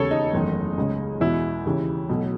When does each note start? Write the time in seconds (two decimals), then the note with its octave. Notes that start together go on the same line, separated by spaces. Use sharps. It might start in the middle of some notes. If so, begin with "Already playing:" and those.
Already playing: E1 D#2 C#3 A4 C#5
0.11 D#4
0.33 F#1 E2 D#3 A3
0.78 C#2 C#3 G#3
1.21 E2 B2 G#3 E4
1.65 D#2 C#3 E3
2.09 B1 B2 F#3 A3